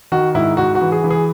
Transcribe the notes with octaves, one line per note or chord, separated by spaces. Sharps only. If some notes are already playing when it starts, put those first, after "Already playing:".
D#3 F#4
G#2 E4
G#2 F#4
F#4
E3
G#4
E3
G#4